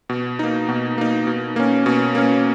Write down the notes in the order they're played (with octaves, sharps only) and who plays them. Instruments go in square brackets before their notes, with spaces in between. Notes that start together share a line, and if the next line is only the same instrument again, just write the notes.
[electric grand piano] B2
A#3 D#4
B2
A#3 D#4
B2
A#3 C#4
B2
A#3 C#4